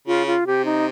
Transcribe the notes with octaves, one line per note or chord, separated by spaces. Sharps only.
C#3 F4
F4
C3 G4
D#4